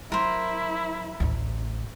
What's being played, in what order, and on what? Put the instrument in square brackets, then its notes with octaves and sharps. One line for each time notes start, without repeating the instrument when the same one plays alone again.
[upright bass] F#3 [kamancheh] E4 [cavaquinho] A#4 C5
[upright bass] A1 D2